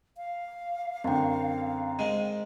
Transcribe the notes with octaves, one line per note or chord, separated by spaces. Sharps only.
F5
F#2 D3 C4 G5
G#2 D#3 G#3 D#7